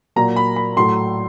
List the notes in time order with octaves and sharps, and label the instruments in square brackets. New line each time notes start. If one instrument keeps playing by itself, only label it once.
[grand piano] A#2 F#3 A#3 A#5
B5
B5
A2 F#3 A3 C6